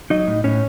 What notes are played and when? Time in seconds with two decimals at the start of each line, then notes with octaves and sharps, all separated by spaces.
0.10 F#3 D#4 D#5
0.27 A2
0.44 A2 C#4 C#5